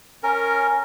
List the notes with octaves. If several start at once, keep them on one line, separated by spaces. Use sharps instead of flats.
C#4 A#4